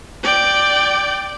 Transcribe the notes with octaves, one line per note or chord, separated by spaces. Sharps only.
D5 G5